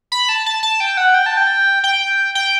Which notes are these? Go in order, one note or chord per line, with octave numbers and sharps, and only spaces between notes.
B5
A5
A5
A5
G5
F#5
G5
A5
G5
G5
G5